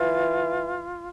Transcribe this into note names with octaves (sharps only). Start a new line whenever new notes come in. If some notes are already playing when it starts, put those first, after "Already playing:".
Already playing: E3 F4